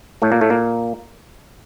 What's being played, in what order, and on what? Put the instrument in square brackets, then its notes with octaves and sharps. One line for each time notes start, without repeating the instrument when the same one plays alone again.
[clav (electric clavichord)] A2 A3
A#2 A#3
A2 A3
A#2 A#3